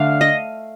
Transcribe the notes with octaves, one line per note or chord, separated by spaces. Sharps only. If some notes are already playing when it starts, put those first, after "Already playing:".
Already playing: D3 A3 D4 F5
D#5